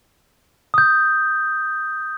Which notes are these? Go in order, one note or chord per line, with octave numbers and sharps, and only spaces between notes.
D#6 G6